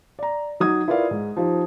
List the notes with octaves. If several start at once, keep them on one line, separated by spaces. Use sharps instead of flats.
D5 A#5
F#3 D#4 D#6 G#6
E4 F4 A#4 B4 D5 F5
G#2
F3 D#4 G4